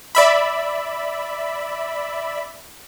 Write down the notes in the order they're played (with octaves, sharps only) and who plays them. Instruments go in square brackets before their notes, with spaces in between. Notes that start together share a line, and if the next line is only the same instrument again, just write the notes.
[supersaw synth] D5 E5 B5